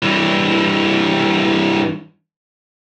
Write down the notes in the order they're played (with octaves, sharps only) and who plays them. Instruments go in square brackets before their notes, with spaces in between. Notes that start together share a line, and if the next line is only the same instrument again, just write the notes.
[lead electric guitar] G2 E3